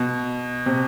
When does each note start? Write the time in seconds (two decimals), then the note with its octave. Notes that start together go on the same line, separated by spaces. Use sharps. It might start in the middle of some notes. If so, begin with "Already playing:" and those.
Already playing: B2
0.66 C3